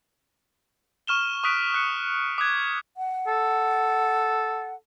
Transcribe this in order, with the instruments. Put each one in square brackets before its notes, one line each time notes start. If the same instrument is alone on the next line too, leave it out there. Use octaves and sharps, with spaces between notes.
[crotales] C#6 F6 E7 G7
C#6 D#6 F#6 B6 D7
F#6 C#7
D6 D#6 F#6 G#6
[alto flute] F#5
[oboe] A4